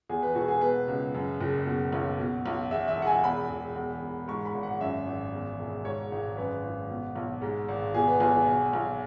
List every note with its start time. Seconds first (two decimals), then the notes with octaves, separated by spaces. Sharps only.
0.09 E2 G#4
0.23 B4
0.35 E1 F#4
0.48 G#4
0.61 B2 B4
0.88 C#2
1.14 F#2
1.41 F#1
1.66 B2
1.92 B1
2.19 B2
2.46 B1
2.71 E2 E5
2.88 E5
2.97 E1
3.02 F#5
3.07 G#5
3.24 E2 B5
3.50 E1
3.76 E2
4.01 E1
4.28 G#2 C#6
4.45 B5
4.55 G#1
4.63 F#5
4.80 F#2 E5
5.07 G#1
5.33 E2
5.59 E1
5.85 G#2 C#5
6.12 G#1
6.37 F#2 B4
6.64 G#1
6.90 B2
7.16 B1
7.42 G#2
7.68 G#1
7.94 B2 G#4
8.07 B4
8.20 B1 G#4
8.34 G#4
8.47 B2
8.73 B1